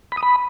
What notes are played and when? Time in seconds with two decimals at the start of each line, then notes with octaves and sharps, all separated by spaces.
0.12 B5
0.17 D#6
0.23 B5